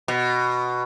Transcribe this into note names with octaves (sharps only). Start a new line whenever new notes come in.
B2